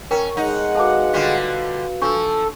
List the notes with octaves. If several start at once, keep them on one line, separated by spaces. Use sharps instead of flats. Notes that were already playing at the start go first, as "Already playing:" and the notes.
C#4 A#4 G5 A#5
G#3 D#4 F#5
F#4 A4 B4 F5 A5 D6
D3 G3 F4
F3 D4 A4 C#6